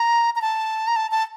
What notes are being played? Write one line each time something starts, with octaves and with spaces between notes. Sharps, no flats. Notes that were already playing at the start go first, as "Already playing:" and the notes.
Already playing: A#5
A#5
A5
A#5
A5
A5